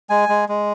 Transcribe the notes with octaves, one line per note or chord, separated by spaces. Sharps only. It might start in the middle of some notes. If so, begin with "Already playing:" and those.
G#3 G#5
G#3
G#3